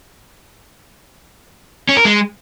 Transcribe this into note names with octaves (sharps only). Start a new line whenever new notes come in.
C#4
A#4
G#3